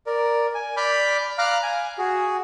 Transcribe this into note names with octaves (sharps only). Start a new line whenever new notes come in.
A#4 D5
G#5
D5 B5 D6 F6 G6
F5 A#5 D6 F6 F#6
G#5
F#4 G#4